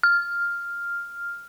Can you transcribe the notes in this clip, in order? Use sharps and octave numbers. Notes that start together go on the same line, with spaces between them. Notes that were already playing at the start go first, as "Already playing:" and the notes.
F6